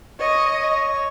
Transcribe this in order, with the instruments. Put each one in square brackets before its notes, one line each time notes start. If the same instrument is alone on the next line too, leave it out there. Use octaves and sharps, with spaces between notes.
[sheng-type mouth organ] C#5 C#6 [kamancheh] D#5